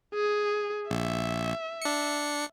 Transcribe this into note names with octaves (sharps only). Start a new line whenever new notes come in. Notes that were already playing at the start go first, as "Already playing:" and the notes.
G#4
A#1 E5
D4 C#7